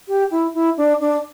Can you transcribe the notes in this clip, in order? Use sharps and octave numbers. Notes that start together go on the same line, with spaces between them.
G4
E4
E4
D4
D4